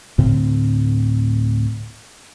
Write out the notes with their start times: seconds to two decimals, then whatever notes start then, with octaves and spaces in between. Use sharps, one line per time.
0.18 D2 A2 D3 C4